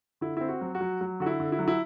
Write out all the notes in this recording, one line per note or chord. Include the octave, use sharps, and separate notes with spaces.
D3 E4
C4 E4
F#4
F#3
F#4
F#3
F#3
D3 F#4
E4
D3
E4
F#3
E4